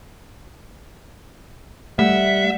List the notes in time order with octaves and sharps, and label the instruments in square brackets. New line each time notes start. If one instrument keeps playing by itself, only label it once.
[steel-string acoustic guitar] G3 [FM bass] A3 [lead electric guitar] E5 [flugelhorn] F#5